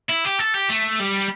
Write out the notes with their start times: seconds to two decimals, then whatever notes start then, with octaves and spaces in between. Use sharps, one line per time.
0.10 E4
0.25 G4
0.39 A4
0.54 G4
0.69 A3
1.00 G3